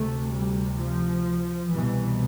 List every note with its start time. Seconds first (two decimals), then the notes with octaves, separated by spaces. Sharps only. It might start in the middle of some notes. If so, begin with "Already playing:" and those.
Already playing: D2 C3 A3
0.30 G3
0.77 F3
1.72 C2 B2 E3